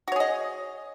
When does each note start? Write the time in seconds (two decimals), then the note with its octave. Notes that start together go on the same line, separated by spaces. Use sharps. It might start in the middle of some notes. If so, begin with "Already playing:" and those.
0.08 F#4
0.12 C#5
0.16 G#4
0.20 D#5